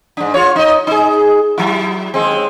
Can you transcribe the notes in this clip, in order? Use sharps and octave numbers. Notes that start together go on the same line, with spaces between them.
G#2 D4
F4 C#5
D#4 D#5
D#4 G#4
F#3 E4
D#2 G#3 C4